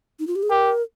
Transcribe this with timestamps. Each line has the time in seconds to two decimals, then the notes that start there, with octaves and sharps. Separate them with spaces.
0.19 D#4
0.27 F4
0.36 G4
0.43 G#4
0.50 G4 A#4